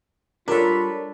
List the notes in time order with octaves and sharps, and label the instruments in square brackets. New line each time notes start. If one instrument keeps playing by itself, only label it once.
[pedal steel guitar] G3 B5 [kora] D4 A4 [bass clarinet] F4 [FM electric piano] A#4 C#5